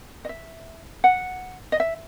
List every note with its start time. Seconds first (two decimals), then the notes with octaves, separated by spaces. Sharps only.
0.25 D#5
0.29 E5
1.04 F#5
1.72 D#5
1.80 E5